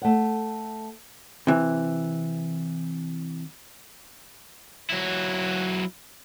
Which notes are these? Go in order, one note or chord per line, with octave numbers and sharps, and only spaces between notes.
A3 F#5
C3 E3
F#3 E4